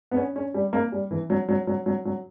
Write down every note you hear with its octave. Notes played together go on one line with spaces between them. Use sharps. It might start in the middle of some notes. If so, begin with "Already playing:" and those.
B3
C#4
C#4
G3
A#3
G3
E3
F#3
F#3
F#3
F#3
F#3